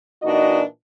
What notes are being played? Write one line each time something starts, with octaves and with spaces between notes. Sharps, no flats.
A#2 E3 D4 D#4 F#4 D#5